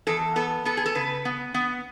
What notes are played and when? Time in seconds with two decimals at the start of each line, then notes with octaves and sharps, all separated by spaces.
0.07 E2 A4
0.36 B3 A4
0.65 B3 A4
0.77 G#4
0.86 A4
0.95 C#3 B4
1.25 B3
1.54 B3